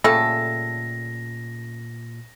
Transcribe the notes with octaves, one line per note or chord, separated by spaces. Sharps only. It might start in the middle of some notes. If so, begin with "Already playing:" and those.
A#2 C#3 G3 A3 A4 A#6